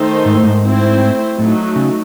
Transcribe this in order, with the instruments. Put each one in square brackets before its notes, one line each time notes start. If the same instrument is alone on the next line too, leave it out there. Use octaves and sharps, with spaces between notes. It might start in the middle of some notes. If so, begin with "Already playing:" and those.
Already playing: [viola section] D#3 A3 D#4 A4 C5
[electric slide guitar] G#2
A2
G#2
[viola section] A3 C4 E4 C5
[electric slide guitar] A2 [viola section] F#3 A3 D#4 F#4
[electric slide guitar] C#3